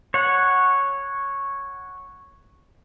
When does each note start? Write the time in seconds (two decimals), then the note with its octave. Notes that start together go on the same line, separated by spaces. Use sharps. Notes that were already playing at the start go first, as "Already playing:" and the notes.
0.14 C#5 F#5